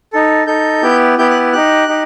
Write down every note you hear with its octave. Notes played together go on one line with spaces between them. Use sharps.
D#4 A4
D#4 A4 G6
B3 E4 G4
B3 E4 G4 G6
F#6
D#4 G4 F#6
D#4 G4